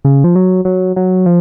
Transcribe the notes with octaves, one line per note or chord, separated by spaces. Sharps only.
C#3
F3
F#3
F#3
F#3
F3